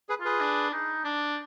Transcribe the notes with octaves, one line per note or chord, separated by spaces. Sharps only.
G#4 B4
F4 G#4 B4
D4
D#4
D4